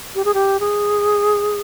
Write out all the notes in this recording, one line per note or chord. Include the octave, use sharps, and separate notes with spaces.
G4
G#4
G4
G#4